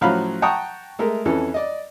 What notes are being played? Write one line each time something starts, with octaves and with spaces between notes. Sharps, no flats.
A2 F3 F#3 C#4 F5 B5
F#5 G5 A5 A#5 C#6 D#6
G#3 A3 A#4 E5
F2 E3 C#4 A4
D5 D#5